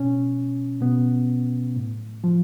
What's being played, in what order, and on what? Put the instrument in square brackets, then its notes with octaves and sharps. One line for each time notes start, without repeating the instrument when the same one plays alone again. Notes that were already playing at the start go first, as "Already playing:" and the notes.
Already playing: [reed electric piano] B2 C#4
B2 B3
A2
F3